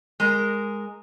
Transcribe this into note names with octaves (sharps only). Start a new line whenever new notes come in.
G#3 A#4